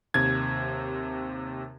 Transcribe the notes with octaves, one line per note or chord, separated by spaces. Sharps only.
D#2 C3 G#6